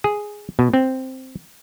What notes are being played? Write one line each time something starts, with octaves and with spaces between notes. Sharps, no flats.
G#4
B2
C4